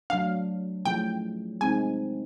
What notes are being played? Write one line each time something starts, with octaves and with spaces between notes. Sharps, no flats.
F#3 A3 D4 F5
F3 A3 C#4 E4 G#4 G5
G#3 C4 D#4 G#5